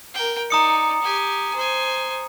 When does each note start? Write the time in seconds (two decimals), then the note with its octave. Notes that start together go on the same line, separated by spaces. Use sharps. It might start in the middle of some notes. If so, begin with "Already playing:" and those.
0.14 A#4 G5
0.50 D#4 D5 A#5 D#6 C#7
1.02 G4 G#5
1.55 C5 G#5